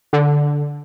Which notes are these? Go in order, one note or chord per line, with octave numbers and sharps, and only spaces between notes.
D3